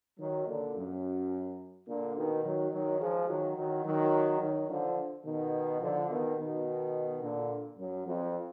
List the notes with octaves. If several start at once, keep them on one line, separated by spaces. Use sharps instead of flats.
D#3 F#3
A#2 D3
F#2
A#2 D3
B2 D#3
D#3 F#3
D#3 F#3
F3 G#3
D#3 F#3
D#3 F#3
D#3 F#3
D#3 F#3
D3 F3
B2 D#3
D3 F3
B2 D#3
B2 D#3
A#2 D3
F#2
F2